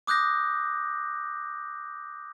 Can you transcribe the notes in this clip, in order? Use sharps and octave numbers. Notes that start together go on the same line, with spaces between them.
D6 D#6 F#6 G6 A#6